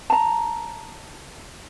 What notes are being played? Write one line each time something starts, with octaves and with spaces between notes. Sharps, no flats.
A5 A#5